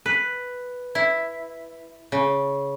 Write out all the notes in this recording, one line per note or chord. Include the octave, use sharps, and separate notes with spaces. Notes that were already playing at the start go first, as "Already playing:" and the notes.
B4
E4
C#3